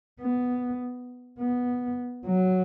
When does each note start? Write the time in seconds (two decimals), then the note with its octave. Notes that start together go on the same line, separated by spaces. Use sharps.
0.21 B3
1.39 B3
2.27 F#3